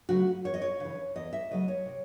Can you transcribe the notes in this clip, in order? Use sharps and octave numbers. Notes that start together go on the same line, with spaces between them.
C#3 F#3 A3 F#4
E2 C#5
D#5
C#5
C#3 E3
E2 D#5
E5
C#3 F#3 A3 D#5
C#5
C3